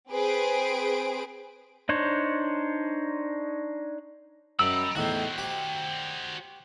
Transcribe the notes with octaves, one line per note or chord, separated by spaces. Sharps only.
C4 G#4 B4 C5 D7
D4 D#4 C5 C#5
F#2 D#5 G5 A#5 B5 E6
E2 A2 D#3 F#4 C5
G4